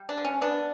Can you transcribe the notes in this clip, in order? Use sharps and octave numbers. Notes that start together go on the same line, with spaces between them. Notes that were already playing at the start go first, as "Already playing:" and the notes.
Already playing: G3
D4
D3
C#4
B3 D4